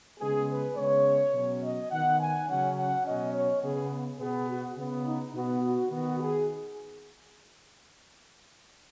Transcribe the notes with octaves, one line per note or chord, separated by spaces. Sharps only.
C#3 G#3 B3 G#4
B4
C#3 G#3 B3 C#5
B2 F#3 C#4
D#5
D#3 B3 F#5
G#5
C#3 F#3 C#4 F#5
F#5
B2 F#3 C#4 D#5
C#5
C#3 B3 G#4
B2 B3 G#4
F#4
C#3 B3
D#4
B2 B3 F#4
F#4
D#3 B3 F#4
G#4